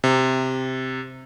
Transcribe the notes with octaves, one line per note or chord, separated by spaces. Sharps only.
C3